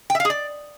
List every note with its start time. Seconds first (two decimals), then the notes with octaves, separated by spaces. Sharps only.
0.10 G5
0.15 E5
0.20 F5
0.25 G#4
0.30 D5